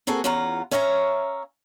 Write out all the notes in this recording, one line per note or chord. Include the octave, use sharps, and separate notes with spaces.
A#3 C4 F#4 G#4 A4
E2 C#4 F4 F#5 A#5
C#4 C#5 E5 F5 G#5 A#5